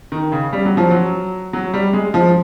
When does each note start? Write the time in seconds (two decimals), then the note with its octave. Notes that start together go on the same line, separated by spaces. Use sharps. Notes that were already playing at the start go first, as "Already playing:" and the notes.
0.12 D#3
0.32 C#3
0.53 G3
0.65 F#3
0.77 F3
0.91 F#3
1.53 F#3
1.74 G3
1.93 G#3
2.14 F3